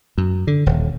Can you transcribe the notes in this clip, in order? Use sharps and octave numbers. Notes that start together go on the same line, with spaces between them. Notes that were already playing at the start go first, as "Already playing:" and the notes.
F#2
D3
D#1